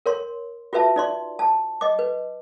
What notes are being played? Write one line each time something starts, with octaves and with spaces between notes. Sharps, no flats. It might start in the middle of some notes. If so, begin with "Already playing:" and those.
A#4 C#5 C6
F4 F#4 B4 E5 A5
D#4 D5 C6
A5
D#5 D6
B4